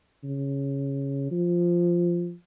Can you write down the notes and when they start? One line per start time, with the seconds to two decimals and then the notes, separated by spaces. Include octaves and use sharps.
0.24 C#3
1.31 F3